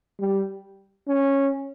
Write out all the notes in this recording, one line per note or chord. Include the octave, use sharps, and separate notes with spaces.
G3
C#4